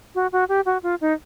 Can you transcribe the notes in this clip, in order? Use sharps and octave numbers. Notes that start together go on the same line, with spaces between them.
F#4
F#4
G4
F#4
F4
D#4